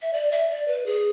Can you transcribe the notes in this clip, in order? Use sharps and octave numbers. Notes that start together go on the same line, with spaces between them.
E5
D5
E5
D5
B4
G#4